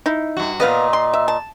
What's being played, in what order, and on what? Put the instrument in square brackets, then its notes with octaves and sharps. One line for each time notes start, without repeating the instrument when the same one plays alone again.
[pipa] D#4 E4
[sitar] G2 F#4
[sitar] A#2 D#5 [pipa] B3 B4 F5
[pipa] C6
E5
A5